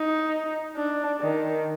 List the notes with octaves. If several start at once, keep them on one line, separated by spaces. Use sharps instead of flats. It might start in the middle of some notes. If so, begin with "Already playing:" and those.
Already playing: D#4
D4
D#3